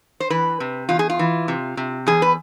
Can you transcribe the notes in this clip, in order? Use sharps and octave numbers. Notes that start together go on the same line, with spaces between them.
C5
E3 B4
C3
E2 F4
G#4
F4
E3
C3
C3
E2 G#4
B4